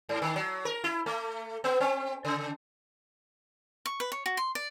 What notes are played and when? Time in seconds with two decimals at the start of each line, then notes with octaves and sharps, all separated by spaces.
0.09 G#2
0.22 D#3
0.36 F#3
0.65 A#4
0.84 E4
1.06 A3
1.64 B3
1.80 C4
2.25 C#3
3.86 C#6
4.00 B4
4.12 C#5
4.26 F#4
4.37 C6
4.55 D5